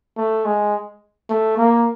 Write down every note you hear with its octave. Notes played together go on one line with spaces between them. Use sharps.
A3
G#3
A3
A#3